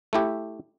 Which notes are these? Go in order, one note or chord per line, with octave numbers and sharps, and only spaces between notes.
A3 E4 G4